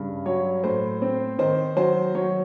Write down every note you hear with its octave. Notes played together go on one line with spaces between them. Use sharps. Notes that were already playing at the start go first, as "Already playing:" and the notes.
Already playing: G2 C#3
F#3 C#5
A2 C5
C4
D#3 C5
F#3 C5
F#3 C#5